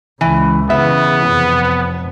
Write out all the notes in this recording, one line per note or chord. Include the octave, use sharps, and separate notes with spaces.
C#2 C#3 E3
C#3 E3 B3 E5
F1